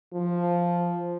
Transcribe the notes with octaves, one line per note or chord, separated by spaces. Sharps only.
F3